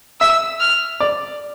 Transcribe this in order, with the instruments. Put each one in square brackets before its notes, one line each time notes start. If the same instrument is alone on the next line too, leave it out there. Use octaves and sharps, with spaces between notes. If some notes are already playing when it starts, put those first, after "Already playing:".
[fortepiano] E5 [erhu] E6
[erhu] F6
[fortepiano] D5